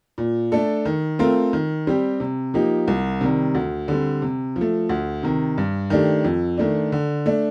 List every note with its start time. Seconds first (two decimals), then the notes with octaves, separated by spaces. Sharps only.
0.18 A#2
0.52 A3 D4 A4
0.85 D#3
1.19 A3 C4 F4 A#4
1.53 D#3
1.87 G3 C4 G4
2.20 C3
2.54 F3 A#3 D#4 G4
2.88 C2
3.21 C3 D#3 G3
3.55 D2
3.88 D3 G3 C4
4.22 C3
4.56 F3
4.61 A3
4.89 D2
5.23 C3 D#3
5.58 G2
5.90 D#3 A3 D4 G4
6.24 F2
6.58 D#3 A3 D4
6.92 D3
7.26 A3 D4